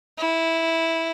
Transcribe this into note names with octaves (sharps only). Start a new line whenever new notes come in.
E4